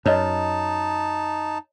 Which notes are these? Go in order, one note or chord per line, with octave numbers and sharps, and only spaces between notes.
F#2 D#4 C#5 D#5 A5